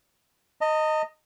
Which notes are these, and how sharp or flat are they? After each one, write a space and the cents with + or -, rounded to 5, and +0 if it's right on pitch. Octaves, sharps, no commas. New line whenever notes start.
D#5 +0 A#5 -45